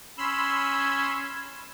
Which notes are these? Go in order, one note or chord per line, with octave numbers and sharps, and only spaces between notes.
C#4 B5 C6 E6